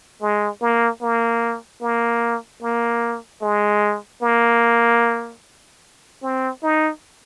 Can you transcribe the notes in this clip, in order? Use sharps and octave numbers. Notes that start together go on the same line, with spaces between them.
G#3
A#3
A#3
A#3
A#3
G#3
A#3
C4
D#4